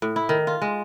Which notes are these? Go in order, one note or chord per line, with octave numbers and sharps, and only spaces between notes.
A2
E4
D#3
F4
G#3